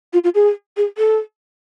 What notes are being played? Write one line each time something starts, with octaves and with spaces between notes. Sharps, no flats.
F4
F4
G#4
G#4
A4